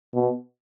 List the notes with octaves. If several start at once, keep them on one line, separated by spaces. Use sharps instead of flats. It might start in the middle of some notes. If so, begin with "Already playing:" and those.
B2